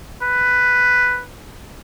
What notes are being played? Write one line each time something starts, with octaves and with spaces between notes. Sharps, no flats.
B4